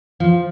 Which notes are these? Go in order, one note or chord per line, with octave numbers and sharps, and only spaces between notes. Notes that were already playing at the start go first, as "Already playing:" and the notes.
F3